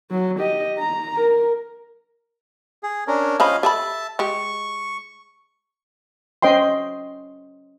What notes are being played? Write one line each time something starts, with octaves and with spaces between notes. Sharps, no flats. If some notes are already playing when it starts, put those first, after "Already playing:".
F#3
G4 D#5
A#5
A#4
G#4
C#4 D4 A#4
F3 C#4 C5 D#5 F5 B5
G4 A4 E5 A5 B5
G#3 G4 C#6
C#4 C5 D#5 G5 C6